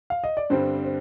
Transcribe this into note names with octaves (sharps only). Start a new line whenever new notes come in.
F5
D#5
D5
G2 D3 G3 C4 C5
C5